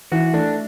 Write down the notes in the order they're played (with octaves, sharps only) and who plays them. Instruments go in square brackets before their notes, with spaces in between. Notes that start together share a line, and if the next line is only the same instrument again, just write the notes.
[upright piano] E3 [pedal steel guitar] F#4
[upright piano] A3 [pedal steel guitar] D4